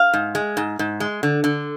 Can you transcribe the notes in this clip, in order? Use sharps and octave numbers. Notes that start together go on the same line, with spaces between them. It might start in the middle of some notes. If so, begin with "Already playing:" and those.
Already playing: F5
G#2
G#3
G#2
G#2
G#3
D3
D3